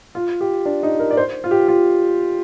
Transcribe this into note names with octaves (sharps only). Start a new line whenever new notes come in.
F4
G4
D4
D#4
A#4
D5
C5
F4
G4
F4